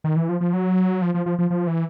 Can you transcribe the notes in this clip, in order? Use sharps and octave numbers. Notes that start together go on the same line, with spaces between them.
D#3
E3
F3
F3
F#3
F3
F3
F3
F3
F3
E3